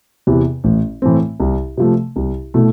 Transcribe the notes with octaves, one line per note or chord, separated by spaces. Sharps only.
E2 C3 E3 B3
A1
A2 E3 A3 C4
C2
C3 F3 A3
C2
B2 A3 E4 A4